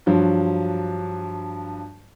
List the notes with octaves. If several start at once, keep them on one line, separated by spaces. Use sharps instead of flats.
G2 F3 F#3